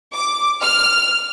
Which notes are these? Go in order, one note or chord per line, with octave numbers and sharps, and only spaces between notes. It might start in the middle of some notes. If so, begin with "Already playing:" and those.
D6
F6